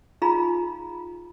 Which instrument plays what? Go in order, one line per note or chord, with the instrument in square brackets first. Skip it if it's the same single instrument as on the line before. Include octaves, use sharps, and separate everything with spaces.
[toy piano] D#4 F4 G#4 F5 A#5 B5